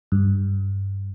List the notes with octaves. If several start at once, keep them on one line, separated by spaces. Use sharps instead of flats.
G2